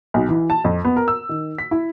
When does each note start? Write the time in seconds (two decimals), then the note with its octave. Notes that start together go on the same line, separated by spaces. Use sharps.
0.14 B1
0.29 E3
0.50 A5
0.64 F2
0.85 B3
0.96 A#4
1.08 E6
1.29 D#3
1.58 B6
1.71 E4